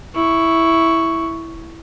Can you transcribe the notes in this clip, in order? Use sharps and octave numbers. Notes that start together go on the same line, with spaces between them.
E4 C#6